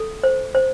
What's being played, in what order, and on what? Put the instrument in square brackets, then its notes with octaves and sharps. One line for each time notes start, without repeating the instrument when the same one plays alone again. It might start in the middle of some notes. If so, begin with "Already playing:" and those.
Already playing: [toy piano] A4
C5
C5